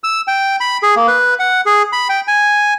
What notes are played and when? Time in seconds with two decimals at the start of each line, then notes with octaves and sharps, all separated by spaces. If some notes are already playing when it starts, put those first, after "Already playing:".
0.04 E6
0.27 G5
0.61 B5
0.83 G#4
0.96 A#3
1.08 B4
1.39 F#5
1.66 G#4
1.93 B5
2.09 G5
2.28 G#5